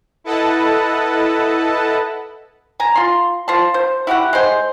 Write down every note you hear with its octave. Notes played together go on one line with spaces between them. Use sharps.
E4 A4 B4 D#5 F#5 A5
G#5 A#5
F4 C6
F4 C5 A5
C5
E4 F#4 G4 F#5
G#3 C5